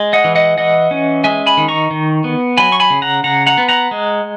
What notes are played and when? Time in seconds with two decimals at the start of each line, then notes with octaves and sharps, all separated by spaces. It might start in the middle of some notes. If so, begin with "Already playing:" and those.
Already playing: G#3
0.13 D#5 F#5
0.24 E3
0.35 D#5 F#5
0.58 E3 D#5 F#5
0.91 C#4
1.24 G#3 E5 G#5
1.46 G#5 B5
1.57 D#3
1.68 A#5 C#6
1.91 D#3
2.24 B3
2.57 F#3 G#5 B5
2.72 C#6
2.80 G#5 B5
2.90 C#3
3.02 F#5 A#5
3.24 C#3 F#5 A#5
3.46 F#5 A#5
3.58 B3
3.69 F#5 A#5
3.91 G#3